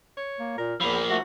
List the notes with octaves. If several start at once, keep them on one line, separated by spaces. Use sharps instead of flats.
C#5
A#3
A#2 A#4
E2 F3 A#3 B5
A3 F#4